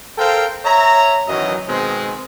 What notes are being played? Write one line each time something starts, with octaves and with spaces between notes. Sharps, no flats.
A4 A#4 C5 F5 G5
C#5 E5 A#5
F#2 D#3 E3 F#3 D#5
B2 D#3 G#3 C4